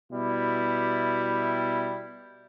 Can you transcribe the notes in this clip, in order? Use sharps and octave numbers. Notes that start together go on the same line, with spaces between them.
B2 G3 E4